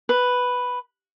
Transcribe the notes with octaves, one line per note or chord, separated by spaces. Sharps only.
B4